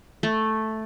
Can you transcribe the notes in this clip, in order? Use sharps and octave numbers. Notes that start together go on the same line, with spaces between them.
A3